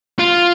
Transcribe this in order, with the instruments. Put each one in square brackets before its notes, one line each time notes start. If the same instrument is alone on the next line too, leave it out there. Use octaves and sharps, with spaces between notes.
[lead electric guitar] F4